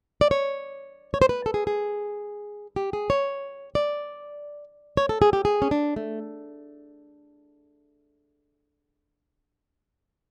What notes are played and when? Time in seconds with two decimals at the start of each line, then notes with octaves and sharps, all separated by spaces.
0.21 D5
0.31 C#5
1.14 C#5
1.22 C5
1.29 B4
1.46 A4
1.54 G#4
1.67 G#4
2.76 G4
2.93 G#4
3.10 C#5
3.75 D5
4.97 C#5
5.09 A4
5.22 G#4
5.33 G4
5.45 G#4
5.62 C#4
5.71 D4
5.96 A3